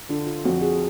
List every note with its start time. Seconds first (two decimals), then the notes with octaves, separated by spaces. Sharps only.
0.09 D3 F4
0.27 F4
0.44 F2 F#4
0.62 G#4